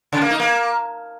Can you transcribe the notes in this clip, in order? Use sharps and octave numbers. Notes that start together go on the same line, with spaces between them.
C#3
A#3
D#4
A#3